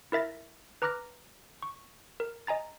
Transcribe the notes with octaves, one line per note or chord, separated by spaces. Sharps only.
E4 A#4 E5 A6 A#6
B4 A#5 D6 F6 F#6 A#6
C#6
A#4
D#5 G#5 A#5 A6